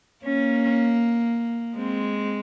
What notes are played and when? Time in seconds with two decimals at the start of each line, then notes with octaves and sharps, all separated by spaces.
0.25 A#3 C#4
1.77 G#3 C4